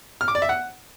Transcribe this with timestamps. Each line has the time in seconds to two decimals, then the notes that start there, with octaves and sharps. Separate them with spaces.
0.21 F6
0.28 D6
0.35 D5
0.42 E5
0.49 F#5